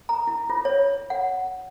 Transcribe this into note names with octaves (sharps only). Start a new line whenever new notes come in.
A#5
E4
F4
C#5
F#5